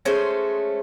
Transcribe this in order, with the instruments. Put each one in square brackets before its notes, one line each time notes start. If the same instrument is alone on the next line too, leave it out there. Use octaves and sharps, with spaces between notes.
[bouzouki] G#3 A3 C#4 C5